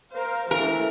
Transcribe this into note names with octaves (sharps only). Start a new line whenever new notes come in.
A#4 C5 F5
E3 A3 A#4